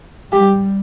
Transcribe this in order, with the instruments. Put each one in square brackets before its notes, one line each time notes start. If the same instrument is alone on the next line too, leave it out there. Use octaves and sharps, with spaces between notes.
[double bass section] G3 [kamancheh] G4